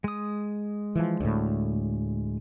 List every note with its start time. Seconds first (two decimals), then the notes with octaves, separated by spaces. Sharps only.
0.04 G#3 D#6
0.96 E3 F3
1.20 D2 A2